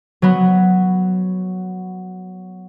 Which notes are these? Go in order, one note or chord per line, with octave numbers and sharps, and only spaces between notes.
F#3 B3